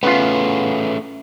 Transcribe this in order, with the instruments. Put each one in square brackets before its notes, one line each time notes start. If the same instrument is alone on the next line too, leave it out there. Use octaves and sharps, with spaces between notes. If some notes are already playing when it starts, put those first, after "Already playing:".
[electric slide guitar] A3 C#4 G#4 [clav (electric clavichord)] B3 F4